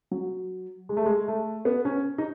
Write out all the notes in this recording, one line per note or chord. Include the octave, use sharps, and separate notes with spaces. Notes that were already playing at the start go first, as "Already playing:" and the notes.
F#3
G#3
A3
G#3
A3
B3
C#4
D#4